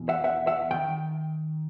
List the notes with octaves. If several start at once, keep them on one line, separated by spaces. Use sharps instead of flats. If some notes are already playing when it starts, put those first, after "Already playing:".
Already playing: E2 B2
E5 F#5
E5 F#5
E5 F#5
D#3 G5